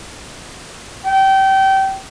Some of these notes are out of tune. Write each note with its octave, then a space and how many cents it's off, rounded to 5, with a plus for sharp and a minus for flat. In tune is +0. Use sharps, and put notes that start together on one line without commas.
G5 -25